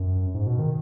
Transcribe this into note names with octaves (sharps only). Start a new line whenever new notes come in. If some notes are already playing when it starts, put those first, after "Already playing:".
Already playing: F#2
G#2
B2
D#3